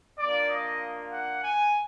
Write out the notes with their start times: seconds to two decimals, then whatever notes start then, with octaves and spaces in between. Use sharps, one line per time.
0.19 A#3 D4 F4 D5
0.50 D#5
1.11 F#5
1.42 G#5